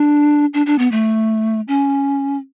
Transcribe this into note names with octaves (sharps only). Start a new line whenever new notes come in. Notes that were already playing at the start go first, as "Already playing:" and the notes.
Already playing: D4
D4
D4
B3
A3
C#4